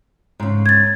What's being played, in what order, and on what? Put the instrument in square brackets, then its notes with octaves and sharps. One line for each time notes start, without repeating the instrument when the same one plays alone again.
[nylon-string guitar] G#2 C#3
[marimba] G#6 A6